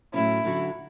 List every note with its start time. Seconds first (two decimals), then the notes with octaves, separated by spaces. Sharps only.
0.14 A2 F#3 C#4 E4
0.44 D3 F#3 C#4 F#4